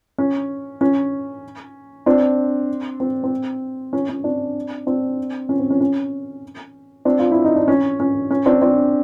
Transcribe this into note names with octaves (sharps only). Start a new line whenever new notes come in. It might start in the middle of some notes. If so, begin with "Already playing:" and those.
C#4
C#4
C4 D4
C4
C4
C#4
C#4
C4 D4
C4 D4
C#4
C4
C#4
C#4
C4 D4
F4
E4
D#4
D4
C#4
C#4
C#4
C4 D4
C4 D4